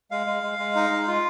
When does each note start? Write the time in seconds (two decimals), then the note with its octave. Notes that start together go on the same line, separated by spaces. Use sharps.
0.11 G#3 F5
0.27 G#3
0.43 G#3
0.59 G#3
0.76 D#4
0.91 G#3
1.08 F4